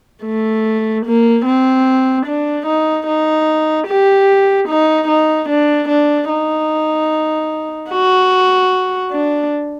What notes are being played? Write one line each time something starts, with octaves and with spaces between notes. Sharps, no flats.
A3
A#3
C4
D4
D#4
D#4
G4
D#4
D#4
D4
D4
D#4
F#4
D4